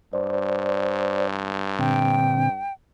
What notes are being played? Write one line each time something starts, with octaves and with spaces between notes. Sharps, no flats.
G2 C5 D5
A#2 D3 C4 G5